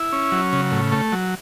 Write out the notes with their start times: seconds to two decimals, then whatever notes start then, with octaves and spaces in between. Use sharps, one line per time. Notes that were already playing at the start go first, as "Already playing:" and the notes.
Already playing: E4
0.12 C#4
0.32 F#3
0.53 C#3
0.72 A2
0.92 A3
1.12 F#3